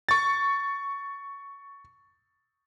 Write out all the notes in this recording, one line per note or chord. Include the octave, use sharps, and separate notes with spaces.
C#6 A6